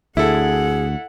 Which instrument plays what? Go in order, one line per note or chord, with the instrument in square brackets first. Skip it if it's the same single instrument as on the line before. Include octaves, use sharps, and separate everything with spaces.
[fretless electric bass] D2 [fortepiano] E4 A4 [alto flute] G#4 [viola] F#5